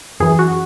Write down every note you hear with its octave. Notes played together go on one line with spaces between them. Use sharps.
F#2 E3 G#4
F#4